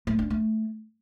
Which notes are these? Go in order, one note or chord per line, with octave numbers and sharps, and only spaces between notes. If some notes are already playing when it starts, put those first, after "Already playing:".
A3
D4
A3